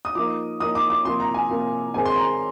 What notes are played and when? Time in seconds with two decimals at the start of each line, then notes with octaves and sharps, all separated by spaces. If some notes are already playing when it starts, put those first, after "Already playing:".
0.05 D#6
0.15 F3 A#3 D#4 D6
0.60 F3 A#3 D#4 D#6
0.75 D6
0.90 D6
1.05 C3 F3 A#3 C6
1.20 A#5
1.34 G#5
1.50 C3 F3 A#3
1.94 D#3 G#3 C4 D#4 G#5
2.05 C6
2.16 A#5